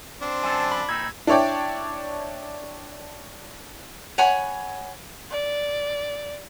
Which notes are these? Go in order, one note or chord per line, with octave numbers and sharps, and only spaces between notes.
C4 D4 C5
F#2 D3 A4 G#5
B5
A#2 C4 D#4 E6 G#6
D4 E4 C#5 D5 G5
C#5 F#5 G#5 B5
D5